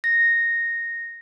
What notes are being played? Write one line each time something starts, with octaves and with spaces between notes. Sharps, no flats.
A#6